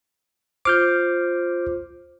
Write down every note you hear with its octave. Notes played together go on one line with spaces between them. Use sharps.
F4 C5 D6 F6 G6